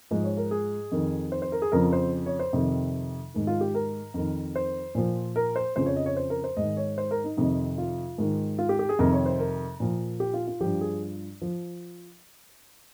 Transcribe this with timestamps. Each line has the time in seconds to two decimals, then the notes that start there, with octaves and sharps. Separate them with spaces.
0.11 G#2 F3 D#5
0.24 C#5
0.37 A#4
0.51 G#4
0.92 F2 D#3
1.32 C5
1.42 C5
1.52 A#4
1.62 G#4
1.72 F2 C#3 F3 A#4
1.93 C5
2.26 C#5
2.39 C5
2.53 F2 C3 D#3
3.34 G#2 D#3
3.47 F4
3.61 G4
3.74 A#4
4.14 F2 D#3
4.56 C5
4.95 A#2 F3
5.36 A#4
5.56 C5
5.76 F2 C#3 F3 C5
5.86 C#5
5.96 D#5
6.06 C#5
6.17 C5
6.30 A#4
6.44 C5
6.57 G#2 D#3 D#5
6.77 C#5
6.98 C5
7.11 A#4
7.24 D#4
7.37 F2 C3 D#3 D#4
7.78 F4
8.18 G#2 D#3
8.59 F4
8.69 G4
8.79 G4
8.89 G#4
8.99 F2 C3 D#3 A#4
9.13 C#5
9.26 C5
9.39 A#4
9.80 A#2 F3
10.20 G4
10.34 F4
10.47 F4
10.60 G2 F3 G4
10.81 G#4
11.42 F3